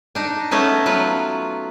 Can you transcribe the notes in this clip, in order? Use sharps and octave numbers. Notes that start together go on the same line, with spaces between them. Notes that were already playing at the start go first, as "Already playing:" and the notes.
D4 D#4
A3 B3 C#4 D#4 B4
F#3 F4 B4